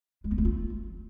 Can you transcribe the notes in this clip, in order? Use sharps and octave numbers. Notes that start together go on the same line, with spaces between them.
G#3
B3
A3
F4